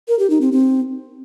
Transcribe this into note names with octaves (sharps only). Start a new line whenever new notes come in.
A#4
G4
D#4
C4
C4